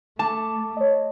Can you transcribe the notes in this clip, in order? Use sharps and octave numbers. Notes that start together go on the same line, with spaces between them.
A3 A5 D6
C#5 D#5